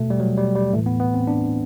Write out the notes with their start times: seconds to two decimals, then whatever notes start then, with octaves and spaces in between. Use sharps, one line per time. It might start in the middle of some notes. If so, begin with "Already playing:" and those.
Already playing: B2 A3
0.10 G3
0.20 F#3
0.37 G3
0.55 G3
0.73 A2 E3 A3
0.86 B3
1.00 B3
1.14 C4
1.27 D4